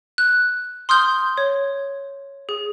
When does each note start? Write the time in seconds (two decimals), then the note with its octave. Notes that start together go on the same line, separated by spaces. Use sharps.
0.18 F#6
0.89 C6 D#6 F6 G6 G7
1.38 C#5
2.49 G#4